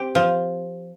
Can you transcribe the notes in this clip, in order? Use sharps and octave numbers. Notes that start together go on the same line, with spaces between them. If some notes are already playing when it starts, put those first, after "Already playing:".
Already playing: C4 G4
F3